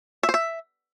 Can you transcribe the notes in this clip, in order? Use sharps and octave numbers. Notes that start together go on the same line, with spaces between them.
E5
C5
E5